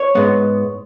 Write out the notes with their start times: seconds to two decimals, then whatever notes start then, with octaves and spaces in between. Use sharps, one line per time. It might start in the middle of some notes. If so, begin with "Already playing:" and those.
Already playing: C#5
0.15 G#2 G#3 B3